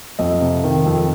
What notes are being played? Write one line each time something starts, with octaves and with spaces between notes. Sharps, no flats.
F2 D#5
C3
D#3
F2